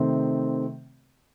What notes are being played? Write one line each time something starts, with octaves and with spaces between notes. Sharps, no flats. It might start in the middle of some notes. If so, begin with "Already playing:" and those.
Already playing: C3 D#3 A3 C4